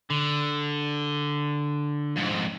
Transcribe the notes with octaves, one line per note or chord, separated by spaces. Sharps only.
D3
F2 G#2